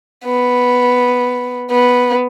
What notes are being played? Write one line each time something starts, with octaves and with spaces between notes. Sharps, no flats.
B3
B3